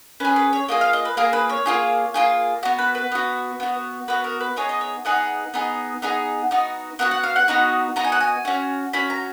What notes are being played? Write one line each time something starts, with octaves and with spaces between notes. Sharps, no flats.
C#4 G#4 B4
B4
C#5
A#3 F4 G#4 D#5
F5
D#5
B4
A#3 F4 G#4 A#4
B4
C#5
A#3 F4 G#4
A#3 F4 G#4
B3 F#4
B4
B4
B3 F#4
B3 F#4
B3 F#4 B4
A#4
B4
B3 D#4 G#4 C#5
D#5
C#5
B3 D#4 G#4 F#5
B3 D#4 G#4
B3 D#4 G#4
B3 D#4 F#4
B3 D#4 F#4 F#5
F#5
F5
F#5
B3 D#4 F#4
B3 D#4 F#4 A#5
G#5
F#5
G#5
C#4 F#4
C#4 F#4 B5
A#5